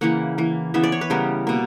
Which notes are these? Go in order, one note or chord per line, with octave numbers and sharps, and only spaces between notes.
C#3 E3 A#3 F#5
E3 A#3
C#3 E3 B3 E5
D5
C#5
B4
C#3 G3 B3 A#4
B2 A#3